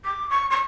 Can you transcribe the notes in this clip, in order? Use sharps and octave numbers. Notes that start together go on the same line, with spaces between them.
D6
C#6
C#6